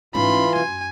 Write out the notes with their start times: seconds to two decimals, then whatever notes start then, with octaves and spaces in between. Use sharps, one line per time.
0.15 G#2 E3 C#4 F4 B5 C6
0.55 F#2 G#5